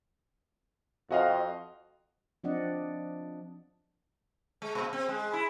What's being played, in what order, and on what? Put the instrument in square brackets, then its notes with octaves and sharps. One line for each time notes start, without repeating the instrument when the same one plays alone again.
[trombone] F2 [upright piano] F#4 D#5 F5
[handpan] F3 C4 D4 D5 D#5 F#5
[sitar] G#3
A#2
C4
G#3
E4